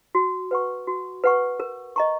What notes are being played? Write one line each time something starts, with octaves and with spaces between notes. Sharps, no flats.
F#4
B4 F#5 C#6
F#4
B4 F#5 C#6
A#4
D#5 A#5 C#6